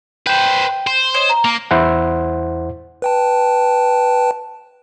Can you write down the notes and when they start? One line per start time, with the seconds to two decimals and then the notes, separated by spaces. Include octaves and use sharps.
0.27 B4 C5 G5
0.87 C5
1.14 C#5 D#5
1.29 A#5
1.45 A#3
1.71 E2 E4 C5 F#5
3.02 B4 G5 A5